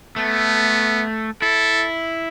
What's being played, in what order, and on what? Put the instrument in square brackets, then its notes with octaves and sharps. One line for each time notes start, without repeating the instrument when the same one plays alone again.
[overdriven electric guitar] A3 [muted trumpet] B3
[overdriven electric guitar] E4 [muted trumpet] A4